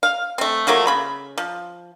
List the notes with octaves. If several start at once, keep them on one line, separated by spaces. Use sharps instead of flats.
F5
A3 C4
F3 F#3 A3 A#3
C#3 B5
F3